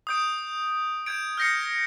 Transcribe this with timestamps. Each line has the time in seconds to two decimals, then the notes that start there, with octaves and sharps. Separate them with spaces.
0.07 D#6 G6 D7
1.06 G6 G#6 D7
1.38 F6 G6 A#6 C7 C#7